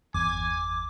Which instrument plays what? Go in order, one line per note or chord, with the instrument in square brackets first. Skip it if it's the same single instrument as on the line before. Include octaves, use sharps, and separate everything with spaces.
[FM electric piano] G1 E2 [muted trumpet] G#5 [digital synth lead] D6